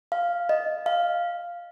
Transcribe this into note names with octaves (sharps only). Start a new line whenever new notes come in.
F5
D#5
F5